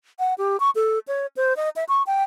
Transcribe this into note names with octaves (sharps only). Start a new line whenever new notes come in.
F#5
G4
C#6
A4
C#5
C5
D#5
E5
C#6
G5